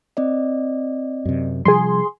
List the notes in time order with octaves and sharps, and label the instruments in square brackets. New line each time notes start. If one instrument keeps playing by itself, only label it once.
[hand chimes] C4 D5 D#5
[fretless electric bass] F#2 C3
[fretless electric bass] C3 F3 G3 [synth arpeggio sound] G#4 C6